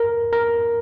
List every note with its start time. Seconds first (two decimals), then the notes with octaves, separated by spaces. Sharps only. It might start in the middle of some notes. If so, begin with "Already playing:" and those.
Already playing: A#4
0.33 A#4